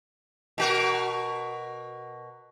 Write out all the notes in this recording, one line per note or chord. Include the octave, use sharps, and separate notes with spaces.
B2 F#4 A#4